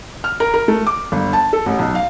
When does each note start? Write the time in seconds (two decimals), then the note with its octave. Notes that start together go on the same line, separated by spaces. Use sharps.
0.24 F6
0.40 A#4
0.54 A#4
0.68 A3
0.87 D6
1.12 G1
1.33 A5
1.53 A4
1.66 A1
1.79 B1
1.95 F5